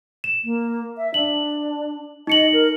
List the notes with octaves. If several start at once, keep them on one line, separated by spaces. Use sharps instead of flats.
E7
A#3
E5
D4 F#7
D#4 D#5 C#7 F#7
A#4